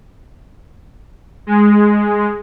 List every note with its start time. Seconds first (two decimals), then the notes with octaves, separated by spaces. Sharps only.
1.47 G#3